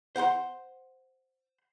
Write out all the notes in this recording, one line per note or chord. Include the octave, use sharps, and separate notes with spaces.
C5 F#5 A#5 C6